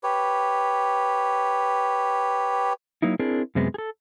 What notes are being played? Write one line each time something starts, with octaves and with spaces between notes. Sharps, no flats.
G4 B4 C#5
F#3 A#3 D#4 E4
C4 D4 E4 G#4 A#4
F#2 C3 G#3 B3
G#4 A4